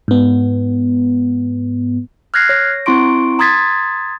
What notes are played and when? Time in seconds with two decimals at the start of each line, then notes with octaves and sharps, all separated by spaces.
0.08 G#2 B3
2.34 F6 F#6 G#6 A#6 C7
2.49 C#5 A#6
2.86 C4 E4 C6 C#6 D7
3.39 A#5 C6 D#6 G#6 A6 B6